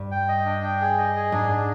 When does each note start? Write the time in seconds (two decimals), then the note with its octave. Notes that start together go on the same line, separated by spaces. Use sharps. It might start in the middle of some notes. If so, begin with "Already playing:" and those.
Already playing: G2
0.11 G5
0.28 D#5
0.45 D4
0.63 G5
0.81 G#4
0.98 D#5
1.15 G#4
1.32 G#2 D4
1.49 D4